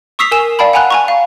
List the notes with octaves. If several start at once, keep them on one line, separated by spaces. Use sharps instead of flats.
C#6 D#6 E6 B6 C7 F7
A#4 G#5 E6 E7
D5 F5 G5 A5 B5
F#5 G#5 A#5 B5 F#6
G#5 A#5 C#6
F5